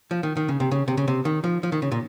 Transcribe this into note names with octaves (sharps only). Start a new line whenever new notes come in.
F3
D#3
D#3
C#3
C3
C#3
C3
C#3
C3
D#3
F3
F3
D#3
C#3
A#2